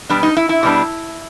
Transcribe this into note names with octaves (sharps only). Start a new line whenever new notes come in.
B2 G3 B3 D4
D#4
E4
E4
B2 G3 B3 D4